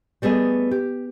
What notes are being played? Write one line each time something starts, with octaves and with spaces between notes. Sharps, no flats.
G3 A3 B3 G#4 D#5
G4